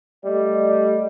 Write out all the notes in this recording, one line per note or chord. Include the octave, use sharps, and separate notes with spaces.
G3 A3 D5 D#5